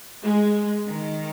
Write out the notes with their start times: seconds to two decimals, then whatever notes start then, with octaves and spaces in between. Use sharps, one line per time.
0.24 G#3
0.86 D#3